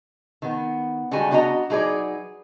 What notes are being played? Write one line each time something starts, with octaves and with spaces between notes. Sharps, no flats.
D#3 B3
D3 G3 G#3 B3 F#4 G#5
B3 D4 F#4 D#5 F#5 A#5
F#3 D#4 G#4 B4 D5